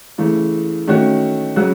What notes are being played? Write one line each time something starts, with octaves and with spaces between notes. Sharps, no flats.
C#3 E3 A3
D#3 A3 C#4 F#4
C#3 F#3 C#4 F#4